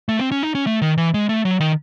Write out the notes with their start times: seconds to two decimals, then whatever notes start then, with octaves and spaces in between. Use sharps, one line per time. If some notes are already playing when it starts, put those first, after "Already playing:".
0.09 A3
0.19 C4
0.32 C#4
0.43 D#4
0.55 C#4
0.67 A3
0.82 D#3
0.98 E3
1.14 G#3
1.29 A3
1.45 F#3
1.60 D#3